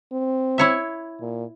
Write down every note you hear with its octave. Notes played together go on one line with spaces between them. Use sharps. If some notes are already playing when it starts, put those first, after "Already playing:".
C4
E4 C#5 E5
A#2